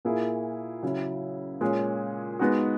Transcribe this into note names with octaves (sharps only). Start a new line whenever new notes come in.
A#2 A#3 E4 G#4
C#3 F#3 C#4 E4
A#2 G#3 C#4 G#4
G#3 B3 D#4 F#4